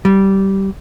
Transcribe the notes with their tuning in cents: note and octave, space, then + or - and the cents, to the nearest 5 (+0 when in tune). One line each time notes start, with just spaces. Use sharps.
G3 -15